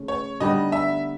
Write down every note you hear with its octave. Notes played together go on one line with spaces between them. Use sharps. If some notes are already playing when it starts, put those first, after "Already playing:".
Already playing: C#3 A3
C#5
D3 G3 B3 D#4 D#5
E5